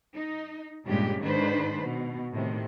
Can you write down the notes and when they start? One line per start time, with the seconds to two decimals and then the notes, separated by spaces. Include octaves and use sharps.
0.15 D#4
0.85 G2 A#2 C#3 G#3 G4
1.21 G#2 D#3 G#3 D4 B4 C5
1.82 B2
2.33 A2 C3 D#3